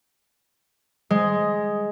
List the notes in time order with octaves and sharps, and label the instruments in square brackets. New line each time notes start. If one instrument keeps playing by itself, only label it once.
[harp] G#3